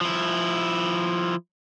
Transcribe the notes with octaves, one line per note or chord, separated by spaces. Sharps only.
F3 E4